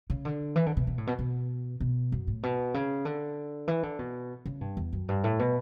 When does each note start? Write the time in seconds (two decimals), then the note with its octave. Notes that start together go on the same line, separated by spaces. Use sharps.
0.10 C#3
0.25 D3
0.56 E3
0.66 D3
0.77 B2
0.87 B2
0.98 A2
1.07 B2
1.19 B2
1.80 B2
2.12 F#2
2.27 A2
2.43 B2
2.74 C#3
3.05 D3
3.68 E3
3.83 D3
3.99 B2
4.46 C#3
4.61 G2
4.77 E2
4.93 F#2
5.09 G2
5.24 A2
5.39 B2